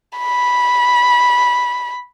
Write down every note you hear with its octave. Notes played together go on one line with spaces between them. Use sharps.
B5